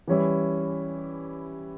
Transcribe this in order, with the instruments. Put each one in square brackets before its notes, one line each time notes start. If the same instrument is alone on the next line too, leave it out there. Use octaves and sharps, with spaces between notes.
[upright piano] E3 G3 C#4 E4